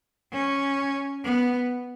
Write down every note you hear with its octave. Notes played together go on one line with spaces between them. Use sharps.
C#4
B3